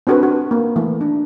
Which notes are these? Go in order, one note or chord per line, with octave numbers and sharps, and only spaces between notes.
C4 D4 F#4 A4 B4
F#4
A#3
E3 A3
D4